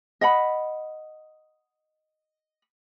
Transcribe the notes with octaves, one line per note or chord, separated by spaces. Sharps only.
D#5 F#5 B5